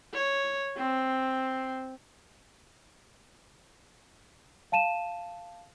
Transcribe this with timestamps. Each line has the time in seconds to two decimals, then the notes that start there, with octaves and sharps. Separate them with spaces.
0.13 C#5
0.77 C4
4.72 F5 A5 D#7 E7